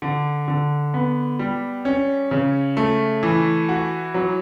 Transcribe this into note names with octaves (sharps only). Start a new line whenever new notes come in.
D3
D3
B3
G3
C#4
C#3
A3
E3
F#4
F#3